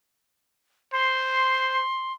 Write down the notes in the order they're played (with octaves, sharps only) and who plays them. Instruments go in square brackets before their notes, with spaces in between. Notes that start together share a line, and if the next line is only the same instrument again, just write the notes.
[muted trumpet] C5 [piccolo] C6